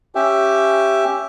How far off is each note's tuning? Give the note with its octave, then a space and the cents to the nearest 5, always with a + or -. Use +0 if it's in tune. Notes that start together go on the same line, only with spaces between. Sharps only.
C#4 +0 G4 +0 E5 +10